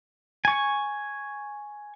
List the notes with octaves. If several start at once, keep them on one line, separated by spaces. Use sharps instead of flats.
G#5 C#6